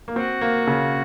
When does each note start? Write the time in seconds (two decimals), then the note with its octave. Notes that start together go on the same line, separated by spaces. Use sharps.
0.08 A#3
0.16 C4 F#4
0.41 A#3
0.67 C#3